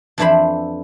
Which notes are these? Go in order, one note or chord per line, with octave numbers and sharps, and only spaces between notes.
F2 E3 D4 E4 C5 B5